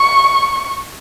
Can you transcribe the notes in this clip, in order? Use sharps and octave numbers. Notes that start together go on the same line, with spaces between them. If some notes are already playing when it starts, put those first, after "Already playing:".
Already playing: C#6